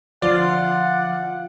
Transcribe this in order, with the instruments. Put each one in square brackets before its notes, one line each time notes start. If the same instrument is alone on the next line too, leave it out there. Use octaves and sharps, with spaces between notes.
[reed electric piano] D3 F3 [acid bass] F4 [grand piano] D5 [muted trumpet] F#5